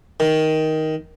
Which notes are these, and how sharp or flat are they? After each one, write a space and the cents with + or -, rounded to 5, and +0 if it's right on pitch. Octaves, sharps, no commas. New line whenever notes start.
D#3 +10